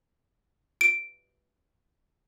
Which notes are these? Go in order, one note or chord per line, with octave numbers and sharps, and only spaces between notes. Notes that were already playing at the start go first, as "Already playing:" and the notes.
D7